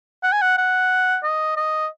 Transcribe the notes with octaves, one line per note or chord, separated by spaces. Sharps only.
F#5
G#5
F#5
F#5
D#5
D#5